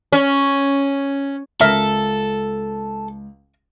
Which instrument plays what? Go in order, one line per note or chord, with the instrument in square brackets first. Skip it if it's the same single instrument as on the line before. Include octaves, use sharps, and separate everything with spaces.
[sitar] C#4
[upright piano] C#2 [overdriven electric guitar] A4 [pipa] A#4 E5